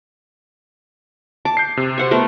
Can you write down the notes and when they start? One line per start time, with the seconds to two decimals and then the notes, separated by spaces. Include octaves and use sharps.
1.45 A5 D6
1.57 G6 C7
1.77 C3
1.98 C5 F#5 C#6
2.11 A3 B3 A#4